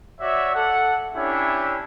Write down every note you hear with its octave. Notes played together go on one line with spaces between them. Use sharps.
F#4 C#5 D5 E5
A4 F#5
C#4 D4 E4 G4 C#5 E5